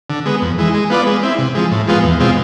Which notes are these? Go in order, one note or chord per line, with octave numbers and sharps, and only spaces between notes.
D3
G#3 B3
F2
E3 G#3
G#3
B3 F4 B4 D5
G#3
C4 E4
C3
F3 G#3
A2
F3 G#3 B3 F4
E2
B2 G#3 C4 F4